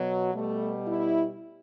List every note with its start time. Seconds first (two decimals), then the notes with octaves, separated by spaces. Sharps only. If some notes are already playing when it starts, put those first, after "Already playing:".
Already playing: B2 F#3
0.34 B2 G3 A3
0.88 E4